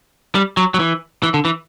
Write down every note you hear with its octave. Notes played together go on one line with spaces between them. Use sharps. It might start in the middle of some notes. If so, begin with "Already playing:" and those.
G3
F#3
F#3
E3
E3
D3
E3